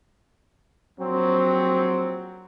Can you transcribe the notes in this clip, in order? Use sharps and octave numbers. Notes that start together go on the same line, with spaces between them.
A#1 F#3 C4